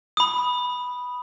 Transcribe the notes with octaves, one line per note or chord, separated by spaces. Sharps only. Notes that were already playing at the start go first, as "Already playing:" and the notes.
B5 D#6